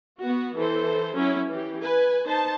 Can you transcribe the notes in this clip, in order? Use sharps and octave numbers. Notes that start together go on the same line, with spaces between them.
B3 F#4
E3 A4 C5
F#3 C#4 E4
E3 G4
B4 G#5
D#4 C5 A5